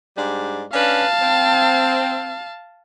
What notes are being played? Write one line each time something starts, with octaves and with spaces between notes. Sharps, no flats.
G#2 G3 D4
C#4 D4 B4 F5 A5
C4